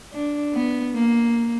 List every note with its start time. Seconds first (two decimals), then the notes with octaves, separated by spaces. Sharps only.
0.13 D4
0.54 B3
0.95 A#3